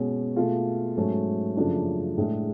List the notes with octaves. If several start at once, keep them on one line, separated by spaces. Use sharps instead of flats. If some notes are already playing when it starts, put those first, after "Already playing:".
Already playing: B2 G#3 C#4
B2 A3 F4 G#4
G#2 F#3 A3 C#4
F#2 C#3 F3 A3 D4
A2 G#3 D4 G#4